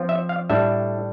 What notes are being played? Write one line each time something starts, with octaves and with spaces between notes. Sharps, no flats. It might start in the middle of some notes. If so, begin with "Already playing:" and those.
Already playing: F3 C4 F4
E5
F5
A2 G3 D4 E5